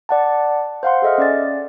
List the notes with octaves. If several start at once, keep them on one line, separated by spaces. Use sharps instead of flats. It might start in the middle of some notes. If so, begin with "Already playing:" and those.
D5 F#5 A5
C5 F5 F#5 C6
G#4 A4 D#5 E5 F6
C#4 D5 A6